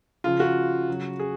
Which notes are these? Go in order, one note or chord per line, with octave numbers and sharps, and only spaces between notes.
C#3 F3 F4
F#4
C#3 F#3
G#4